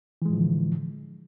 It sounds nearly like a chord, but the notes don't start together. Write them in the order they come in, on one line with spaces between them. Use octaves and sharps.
E3 G#3 A2 F3 D3